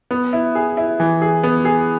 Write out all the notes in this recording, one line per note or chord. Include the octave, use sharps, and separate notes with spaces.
B3
E4
G#4
E4
E3
G#4
B3
G#4